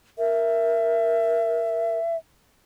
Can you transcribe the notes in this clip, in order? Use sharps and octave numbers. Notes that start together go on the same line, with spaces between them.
A#4 E5